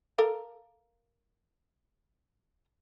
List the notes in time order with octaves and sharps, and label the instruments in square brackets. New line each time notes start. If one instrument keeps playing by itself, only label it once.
[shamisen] A4 A#4 F5